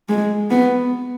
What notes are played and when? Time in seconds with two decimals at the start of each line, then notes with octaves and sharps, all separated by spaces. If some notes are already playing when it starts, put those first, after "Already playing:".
0.09 G#3
0.50 B3